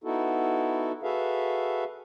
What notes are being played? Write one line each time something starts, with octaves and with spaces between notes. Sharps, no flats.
B3 D#4 E4 F#4 A4
F#4 G#4 A4 B4 E5 F5